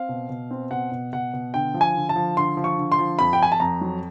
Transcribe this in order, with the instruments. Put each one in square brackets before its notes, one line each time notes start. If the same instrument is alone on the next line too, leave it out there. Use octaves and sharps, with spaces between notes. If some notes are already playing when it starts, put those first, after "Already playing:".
Already playing: [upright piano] C4 F5
B2
B2
C4
B2 F#5
B2
B2 F#5
B2
D3 G5
F3
G#5
D3
A5
F3
D3 C6
F3
C#6
D3
C6
F3
F2 B5
G5
F2 G#5
A5
F2 A#5
F#3